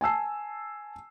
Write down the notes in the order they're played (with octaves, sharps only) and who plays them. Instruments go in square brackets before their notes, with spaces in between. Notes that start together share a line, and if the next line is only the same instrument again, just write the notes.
[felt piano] G#5 A5 E6 C7